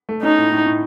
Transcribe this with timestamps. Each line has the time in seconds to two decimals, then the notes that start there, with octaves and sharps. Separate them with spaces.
0.09 A3
0.22 C#4 D#4
0.38 A2
0.52 A2
0.66 A2